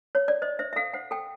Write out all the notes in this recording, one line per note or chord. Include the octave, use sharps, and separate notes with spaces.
C#5
D5
C5 D#5
C5 E5
E5
A4 F5
C5 F#5
A4 G5